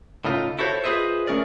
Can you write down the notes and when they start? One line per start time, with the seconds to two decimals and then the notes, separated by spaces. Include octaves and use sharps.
0.25 A2 C#3 D#4 F4
0.59 E4 F#4 A4 C5 C#5
0.84 F4 G#4 B4 C5 D#5 E5
1.27 A3 C#4 G#4 A#4 D5